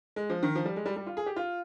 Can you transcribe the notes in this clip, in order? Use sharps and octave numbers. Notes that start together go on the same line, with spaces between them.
G#3
F3
D#3
F3
G3
G#3
G3
G3
F4
G#4
G4
F4